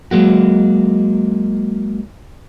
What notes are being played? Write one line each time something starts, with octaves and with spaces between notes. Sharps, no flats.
F#3 G#3 A#3 F#4